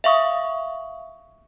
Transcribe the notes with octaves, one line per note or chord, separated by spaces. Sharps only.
E5 F5 C#6 D#6